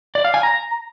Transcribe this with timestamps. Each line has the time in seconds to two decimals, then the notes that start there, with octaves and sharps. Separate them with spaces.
0.15 D5
0.25 F5
0.34 G#5
0.43 A#5